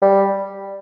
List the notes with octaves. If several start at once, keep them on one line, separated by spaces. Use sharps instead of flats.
G3